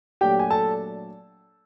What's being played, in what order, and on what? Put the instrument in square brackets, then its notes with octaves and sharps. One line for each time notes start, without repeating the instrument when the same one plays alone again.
[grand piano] A#2 F#3 A3 D4 G4 G5
G#5
A4 A5